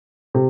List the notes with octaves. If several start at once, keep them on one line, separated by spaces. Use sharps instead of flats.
C3